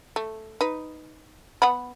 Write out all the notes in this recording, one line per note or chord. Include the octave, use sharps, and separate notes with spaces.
A3
D#4 B4
B3 F#5 B5